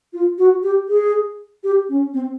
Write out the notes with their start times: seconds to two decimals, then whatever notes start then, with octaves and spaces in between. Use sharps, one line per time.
0.13 F4
0.38 F#4
0.63 G4
0.89 G#4
1.64 G4
1.89 C#4
2.14 C4